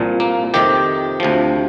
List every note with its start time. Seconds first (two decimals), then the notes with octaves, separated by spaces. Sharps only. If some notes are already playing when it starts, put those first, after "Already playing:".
Already playing: C2 A#2 F3
0.20 A#3
0.54 F2 C3 D#3 G4
1.20 D2 C3 F3